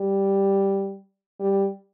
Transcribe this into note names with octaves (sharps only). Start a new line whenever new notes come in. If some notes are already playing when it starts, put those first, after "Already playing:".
Already playing: G3
G3